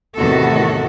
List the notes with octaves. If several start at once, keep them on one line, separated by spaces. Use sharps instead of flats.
E2 A2 C3 D#3 F#4 A4